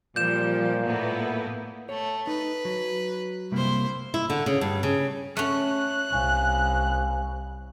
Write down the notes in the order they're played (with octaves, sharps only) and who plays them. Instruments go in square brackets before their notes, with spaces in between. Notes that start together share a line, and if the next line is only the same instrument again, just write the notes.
[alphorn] A#2 [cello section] F3 G3 [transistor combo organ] F4 D5 [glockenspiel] G6 E7
[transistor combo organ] A2 [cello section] A#3 B3 E4
[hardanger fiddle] A3 [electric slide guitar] C#5
[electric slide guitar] D#4 [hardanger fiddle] B4
[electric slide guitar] F#3
[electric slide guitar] C3 G3 A#3 [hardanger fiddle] E4 C5
[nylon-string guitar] E4
D3
C#3
G2
C#3
[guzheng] A3 C#4 [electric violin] F#6
[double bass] C2 [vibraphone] F5 G#5 C#6